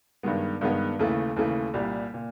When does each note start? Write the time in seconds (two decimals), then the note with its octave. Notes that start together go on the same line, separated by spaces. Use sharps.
0.23 G2 D#3 G#3 B3
0.61 G2 D#3 G#3 B3
0.99 D#2 C#3 E3 A3
1.36 D#2 C#3 E3 A3
1.74 C2 A#2 G3
2.14 A#2